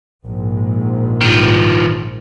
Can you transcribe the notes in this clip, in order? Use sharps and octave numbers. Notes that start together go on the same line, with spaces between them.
A#1 G#2
D#3 F3